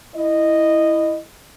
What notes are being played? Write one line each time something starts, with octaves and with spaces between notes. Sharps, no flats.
E4 D#5